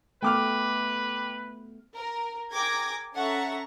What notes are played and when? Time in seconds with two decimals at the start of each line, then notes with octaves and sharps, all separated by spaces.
0.22 A3 B3 B4 G5 D6 F6
1.95 A#4
2.52 G#4 A#4 G5 D6 G#6 A#6
3.15 C#4 A4 E5 F#5 A#5 C#6